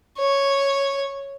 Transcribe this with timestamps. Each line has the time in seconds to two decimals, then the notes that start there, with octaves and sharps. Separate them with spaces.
0.18 C#5